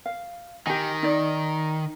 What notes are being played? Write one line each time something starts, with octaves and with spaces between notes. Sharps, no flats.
F5
D#3 G4 G#5
D#4 D5